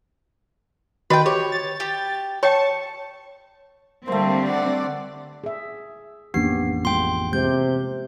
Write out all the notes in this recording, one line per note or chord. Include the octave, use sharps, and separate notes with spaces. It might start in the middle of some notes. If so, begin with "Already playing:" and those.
D#3 F#4 B4 D#5 G5
G4 C#5
A6
G4
C#5 G5 A5 C#6
D3 G3 A3 A#3 C4 C5
D5 F#5
G#4 E5
A1 F2 A#3 B3 C#4 D4 G4 C7
G#3 B3 F4 G5 C6
C3 G#3 G4 G6